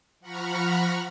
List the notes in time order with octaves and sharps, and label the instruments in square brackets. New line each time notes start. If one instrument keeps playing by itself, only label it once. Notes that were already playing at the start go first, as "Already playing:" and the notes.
[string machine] F3 F#5 A#5 B5 C#6 F6